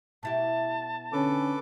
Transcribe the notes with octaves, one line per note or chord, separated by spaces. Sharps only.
B2 E4 G4 A5
D3 C#4 A4 B4 D6